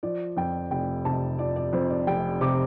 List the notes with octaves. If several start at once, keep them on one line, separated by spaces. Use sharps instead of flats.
F3 D5
F2 G5
F1 G5
C3 A5
F3 D5
D5
F2 C5
D5
F1 G5
C3 D6